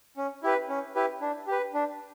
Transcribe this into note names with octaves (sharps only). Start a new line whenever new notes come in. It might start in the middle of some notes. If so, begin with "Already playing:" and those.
C#4
E4 G4 B4
C#4
E4 G4 B4
D4
G4 B4
D4